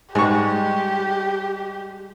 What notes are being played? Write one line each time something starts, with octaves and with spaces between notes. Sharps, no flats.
G#2 G3 G#3 G4 C#6